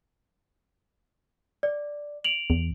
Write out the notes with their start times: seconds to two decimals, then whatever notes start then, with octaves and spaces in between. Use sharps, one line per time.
1.63 D5
2.24 D7 F7 F#7
2.50 E2